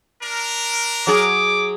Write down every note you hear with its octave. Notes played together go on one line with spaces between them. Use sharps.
D4 A#4
F#3 G#4 D6